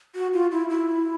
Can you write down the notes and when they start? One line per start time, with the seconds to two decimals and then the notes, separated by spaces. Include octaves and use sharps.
0.15 F#4
0.34 F4
0.52 E4
0.70 E4